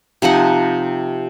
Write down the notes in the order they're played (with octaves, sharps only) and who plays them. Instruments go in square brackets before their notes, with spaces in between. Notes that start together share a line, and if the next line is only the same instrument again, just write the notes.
[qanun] C3 F3 D#4 F#5